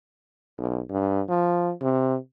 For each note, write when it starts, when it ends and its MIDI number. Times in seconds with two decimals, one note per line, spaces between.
0.58 0.81 35
0.90 1.21 43
1.29 1.72 53
1.82 2.16 48